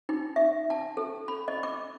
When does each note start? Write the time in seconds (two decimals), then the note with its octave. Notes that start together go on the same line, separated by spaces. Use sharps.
0.09 D#4
0.36 E5
0.70 A5
0.97 A4
1.28 B5
1.48 D#5
1.63 D6